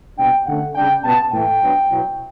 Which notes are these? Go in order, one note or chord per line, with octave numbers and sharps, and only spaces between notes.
B2 G3 B3 D4 G5
D3 A3 C#4 F#5
C#3 G3 D4 G5
B2 G3 B3 A5
A2 E3 A3 G5
F#3 B3 D4
B2 F#3 B3 E4